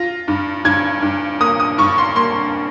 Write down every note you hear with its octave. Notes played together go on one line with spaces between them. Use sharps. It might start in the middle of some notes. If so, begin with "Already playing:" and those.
Already playing: F4 A#6
G2
G2 G#6
G2
A#3 D#6
D#6
G2 C#6
C6
A#3 C6